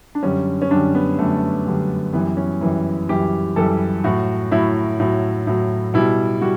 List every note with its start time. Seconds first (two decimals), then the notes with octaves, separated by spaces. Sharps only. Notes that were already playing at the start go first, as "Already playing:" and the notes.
0.15 D4
0.23 F#2 D3 G3 C#4
0.62 C#4
0.70 F#2 D3 G3 D4
0.95 B3
1.18 F#2 D3 G3 A3
1.65 F#2 D3 G3
2.13 F#2 E3 G3 B3
2.37 C#4
2.61 F#2 E3 G3
3.09 F#2 E3 G3 G4
3.56 F#2 E3 G3 A4
4.04 A2 F#3 F#4
4.51 A2 F#3 E4
5.00 A2 F#3
5.47 A2 F#3
5.94 B2 G3 E4
6.41 G3 F#4